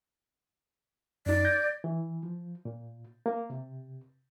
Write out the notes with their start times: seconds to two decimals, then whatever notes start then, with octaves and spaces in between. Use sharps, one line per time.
1.26 F#2 D#4 D5
1.45 G6 G#6 A#6
1.84 E3
2.23 F3
2.65 A#2
3.26 A#3
3.50 C3